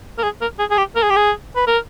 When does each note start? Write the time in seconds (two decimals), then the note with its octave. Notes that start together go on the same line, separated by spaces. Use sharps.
0.18 A#4
0.23 G#4
0.41 A#4
0.59 G#4
0.71 G#4
0.78 G4
0.96 A#4
1.03 G#4
1.10 G4
1.16 G#4
1.56 B4
1.67 A#4